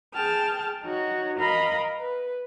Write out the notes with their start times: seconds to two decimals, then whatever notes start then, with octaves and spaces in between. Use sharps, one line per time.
0.13 G#4 G5 A5 F6
0.83 D#4 F#4 C#5
1.38 A#4 D#5 F5 B5
1.99 B4